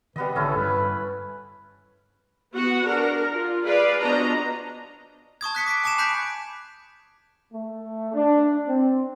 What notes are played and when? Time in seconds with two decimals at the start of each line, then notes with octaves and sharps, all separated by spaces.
0.16 D#3 G3 B3 B4 D#5
0.36 A1 D3 C#4 E4 A4
0.56 G2 B4
2.55 B3 F#4 F#5
2.85 D4 A#4
3.31 F4
3.65 G#4 B4 D5 F5
4.00 F3 B3 D4 F#4 D#5 A#5
5.41 A5 C#6 D#6 G#6
5.55 F#6 B6 C#7
5.66 D6 B6 C#7 D7
5.84 G#5 A5 D6 C7 E7
5.98 A5 B5 F#6 G6 B6 D7
7.52 A3
8.14 D4
8.67 C4